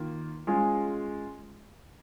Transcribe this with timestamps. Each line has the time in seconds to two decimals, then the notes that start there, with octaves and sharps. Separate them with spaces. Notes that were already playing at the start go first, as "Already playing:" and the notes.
Already playing: D#3 A#3 F4
0.47 G#3 C#4 F4 G#4